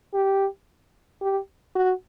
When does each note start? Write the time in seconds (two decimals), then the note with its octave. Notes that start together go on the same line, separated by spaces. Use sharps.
0.14 G4
1.22 G4
1.75 F#4